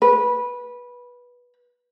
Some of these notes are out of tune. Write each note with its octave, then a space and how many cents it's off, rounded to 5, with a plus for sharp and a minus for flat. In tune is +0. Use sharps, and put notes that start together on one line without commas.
B4 -15